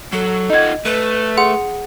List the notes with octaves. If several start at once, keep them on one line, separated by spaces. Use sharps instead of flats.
F#3 A4
D#4 F4 D#5 F#5 G#6
A3 B4
G#4 F#5 C6